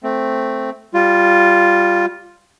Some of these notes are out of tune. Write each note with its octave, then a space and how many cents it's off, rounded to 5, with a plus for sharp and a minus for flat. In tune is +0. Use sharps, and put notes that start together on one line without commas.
A3 +0 C4 +0
G3 +0 F4 +0